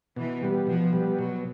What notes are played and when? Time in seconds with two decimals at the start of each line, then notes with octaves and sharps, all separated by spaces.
0.16 B2 E3
0.43 G3 B3
0.67 B2 F3
0.93 G3 B3
1.18 B2 F#3